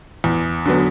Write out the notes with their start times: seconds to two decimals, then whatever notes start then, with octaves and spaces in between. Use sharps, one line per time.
0.24 E2
0.66 D3 F#3 B3